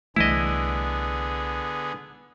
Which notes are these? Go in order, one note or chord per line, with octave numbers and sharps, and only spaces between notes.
C2 D3 E3 A3 B3 E4 G#4 D#5